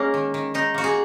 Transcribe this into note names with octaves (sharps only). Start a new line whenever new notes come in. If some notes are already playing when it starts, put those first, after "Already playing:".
Already playing: G#3 A#3 C#4
D#3
D#3
D#3 D#4
A#3 F#4
G#4